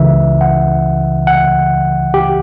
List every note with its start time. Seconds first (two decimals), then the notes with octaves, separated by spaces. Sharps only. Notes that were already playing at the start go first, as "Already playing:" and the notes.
Already playing: C#2 C#3 E3 E5
0.41 F#5
1.27 F#5
2.14 G4